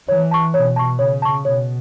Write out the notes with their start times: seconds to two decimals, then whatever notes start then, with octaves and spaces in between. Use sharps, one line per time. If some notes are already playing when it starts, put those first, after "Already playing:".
0.08 E3 C#5
0.31 A5 C#6
0.54 B2 C#5
0.76 A5 C#6
0.99 C#3 C#5
1.22 A5 C#6
1.44 B2 C#5